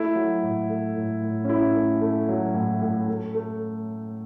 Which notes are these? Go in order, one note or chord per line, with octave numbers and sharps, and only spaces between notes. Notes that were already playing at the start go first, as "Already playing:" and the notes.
Already playing: A3 E4
F#3
A2
A3
A2
A2
C#4
A3 E4
A3
A3
F#3
A2
A2
A3
A3